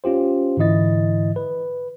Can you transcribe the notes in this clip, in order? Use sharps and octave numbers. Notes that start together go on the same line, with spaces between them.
C#4 F4 G4 C5
G#2 D3 E3 E4 D#5 A6
B4